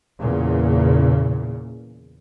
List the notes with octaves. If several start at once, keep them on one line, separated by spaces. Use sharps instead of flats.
E2 A#2 C#3